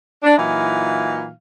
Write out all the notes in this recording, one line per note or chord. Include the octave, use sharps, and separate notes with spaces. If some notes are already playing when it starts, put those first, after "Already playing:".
D4
A#2 E3 F#3 D#4 E4 F5